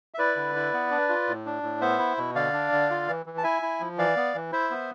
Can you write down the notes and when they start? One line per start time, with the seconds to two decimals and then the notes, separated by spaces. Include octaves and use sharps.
0.14 E5
0.18 E4 B4 D5
0.36 D3
0.55 E4
0.73 B3
0.91 D4
1.09 F4
1.28 A2
1.46 D4
1.63 A2
1.81 B3 C5 E5
1.99 E4
2.18 B2
2.35 D3 D5 F5
2.53 D4
2.72 D3
2.90 F4
3.08 E3
3.26 E3
3.38 A5
3.43 E4 E5 G#5
3.62 E4
3.80 F3
3.98 E3 D5 F5
4.16 B3
4.35 E3
4.52 E4 C5 E5
4.71 B3